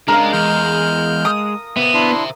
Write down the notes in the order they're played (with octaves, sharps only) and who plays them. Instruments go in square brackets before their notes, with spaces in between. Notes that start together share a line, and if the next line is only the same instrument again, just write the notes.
[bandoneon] C#3 [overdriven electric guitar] G#3 [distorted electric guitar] D4 [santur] A#4 F5
[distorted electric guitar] E2 [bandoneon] F6 G6
[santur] D#6
[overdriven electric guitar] B3 [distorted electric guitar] C5 E5
[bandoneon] D4 E4 C6